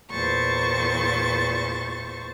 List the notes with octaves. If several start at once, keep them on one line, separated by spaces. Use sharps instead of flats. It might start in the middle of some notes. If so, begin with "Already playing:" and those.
E2 A#2 C5 C#6 A6